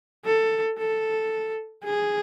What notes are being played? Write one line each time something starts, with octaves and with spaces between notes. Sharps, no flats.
A4
A4
G#4